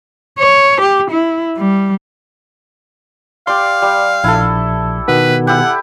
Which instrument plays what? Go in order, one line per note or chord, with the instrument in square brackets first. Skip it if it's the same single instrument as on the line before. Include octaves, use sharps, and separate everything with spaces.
[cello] C#5
G4
E4
G3
[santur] G4 D5 [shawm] F5 [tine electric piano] C6
[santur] G3
[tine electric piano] A#1 [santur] E4 A4
[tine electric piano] B2 D#3 B3 [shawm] B4
[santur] E4 G4 [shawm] F#5